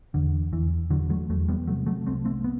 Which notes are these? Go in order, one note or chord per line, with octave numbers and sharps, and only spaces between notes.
E2 D3
E2 E3
E2 D3 F#3
F#3 A3
E2 F#3 A3
G3 B3
C3 F#3 A3
F#3 A3
C2 A3 C4
A3 C4
B3